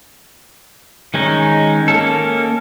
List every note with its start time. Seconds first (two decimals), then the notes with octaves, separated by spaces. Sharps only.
1.14 D#3 G#3 C#4 D#4
1.88 A#3 C#4 A4